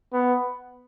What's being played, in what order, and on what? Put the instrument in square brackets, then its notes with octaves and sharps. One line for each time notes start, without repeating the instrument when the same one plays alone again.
[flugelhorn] B3